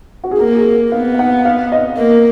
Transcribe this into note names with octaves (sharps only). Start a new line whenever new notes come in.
F#4
G#4
A#3 A#4
G#4
B3 F5
F5
F#5
F5
D#5
A#3